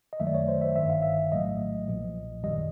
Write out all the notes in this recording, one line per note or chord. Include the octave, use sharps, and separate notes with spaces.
D#5
F#2 D#3 F#3 A3 E5
D5
C#5
C5
E5
G1 G2 D#3 E5
F5
E5
A#1 A2 F#3 A3 D#5
B1 A#2 F3
G#1 F#2 D#3 G3 D#5